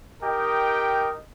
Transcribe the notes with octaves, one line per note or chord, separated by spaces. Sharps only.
D#4 G4 A#4 D#5 G5